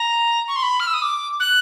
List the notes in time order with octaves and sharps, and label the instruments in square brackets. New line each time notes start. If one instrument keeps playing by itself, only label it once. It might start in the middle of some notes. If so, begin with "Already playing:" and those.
Already playing: [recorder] A#5
C#6
C6
B5
F6
E6
D#6
D6
F#6